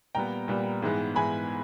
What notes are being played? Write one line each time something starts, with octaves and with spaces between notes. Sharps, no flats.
A#2 G3 B3 G5 A#5
A#2 G3 B3
G#2 E3 G#3 B3
G#2 E3 G#3 B3 G#5 B5